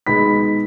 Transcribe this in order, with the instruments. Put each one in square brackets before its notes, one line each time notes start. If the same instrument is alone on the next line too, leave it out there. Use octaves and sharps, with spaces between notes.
[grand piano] B2 G#3 B3 D#4 B5 B6